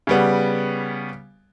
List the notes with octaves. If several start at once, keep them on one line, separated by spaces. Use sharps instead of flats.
C#3 G3 B3